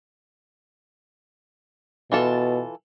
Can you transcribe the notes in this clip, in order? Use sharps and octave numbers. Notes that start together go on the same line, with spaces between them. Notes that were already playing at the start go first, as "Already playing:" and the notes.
B2 E3 F4 A4